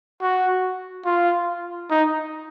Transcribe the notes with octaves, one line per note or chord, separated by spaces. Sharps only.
F#4
F4
D#4